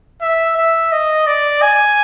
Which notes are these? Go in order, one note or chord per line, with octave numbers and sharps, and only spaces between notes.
E5
E5
D#5
D5
G#5